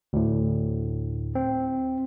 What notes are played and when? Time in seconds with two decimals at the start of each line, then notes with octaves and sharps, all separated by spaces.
0.13 D2 A2
1.35 C4